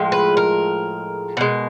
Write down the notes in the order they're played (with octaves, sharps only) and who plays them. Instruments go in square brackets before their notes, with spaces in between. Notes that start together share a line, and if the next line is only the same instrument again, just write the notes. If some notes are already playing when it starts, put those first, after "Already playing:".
Already playing: [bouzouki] A2 F3 G#3
B4
A#4
B2 G#3